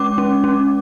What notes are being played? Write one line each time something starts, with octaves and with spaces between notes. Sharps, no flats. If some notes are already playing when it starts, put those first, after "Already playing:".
Already playing: G#3 C#4 D6
C#4
C#4